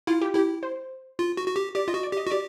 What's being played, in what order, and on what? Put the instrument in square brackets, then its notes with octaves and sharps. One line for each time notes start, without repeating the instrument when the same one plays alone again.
[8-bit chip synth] E4 [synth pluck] F4
[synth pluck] G4
[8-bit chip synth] E4 [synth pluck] G4
[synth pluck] C5
[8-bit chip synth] F4
F#4
F#4
G4
[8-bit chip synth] G4 [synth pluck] D5
[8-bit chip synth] F4 [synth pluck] D#5
[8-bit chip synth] F#4
[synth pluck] D5
[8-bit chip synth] G4 [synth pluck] D#5
[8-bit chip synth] F#4
[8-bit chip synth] G4 [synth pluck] D5